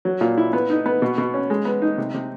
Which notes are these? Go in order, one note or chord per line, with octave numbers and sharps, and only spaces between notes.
F#3
A#2
E4
B3
D#4
B3
B2
B2
C#4
G#3
B3
D#4
C3
C3